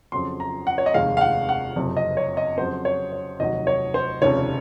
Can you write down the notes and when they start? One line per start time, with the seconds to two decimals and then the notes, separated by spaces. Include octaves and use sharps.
0.12 F2 C#3 F#3 C6
0.40 A#5
0.67 F#5
0.78 C#5
0.86 D#5
0.94 F1 D#2 D#3 G#3 F5
1.17 F5
1.21 F#5
1.49 F#5
1.76 F#1 F2 C3
1.97 D#5
2.17 C#5
2.37 D#5
2.58 F2 C#3 F#3 C5
2.85 C#5
3.13 C#5
3.40 F1 D#2 D#3 F#3 D#5
3.67 C#5
3.94 C5
4.22 F1 D#2 C#3 F3 C#5